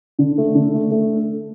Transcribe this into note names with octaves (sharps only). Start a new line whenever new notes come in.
D3
A3
D3
A3
A3